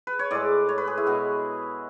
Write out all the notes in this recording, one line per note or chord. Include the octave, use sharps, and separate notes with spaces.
B4
C#5
A2 G#3 D5
C#5
B4
G#4
E4
B2 G#3 F#4